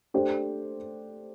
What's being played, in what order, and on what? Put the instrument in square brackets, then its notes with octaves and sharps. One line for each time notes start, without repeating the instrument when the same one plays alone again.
[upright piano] A3 D4 G4 C5